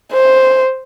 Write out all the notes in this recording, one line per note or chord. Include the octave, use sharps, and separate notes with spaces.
C5